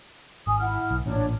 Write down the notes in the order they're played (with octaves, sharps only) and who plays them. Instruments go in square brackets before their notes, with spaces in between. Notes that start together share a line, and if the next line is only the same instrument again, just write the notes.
[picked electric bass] G#1 [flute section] G#5 D#6
[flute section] E4 F#5 F6
[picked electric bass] B1
[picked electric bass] A1 A#2 [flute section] D4 C#5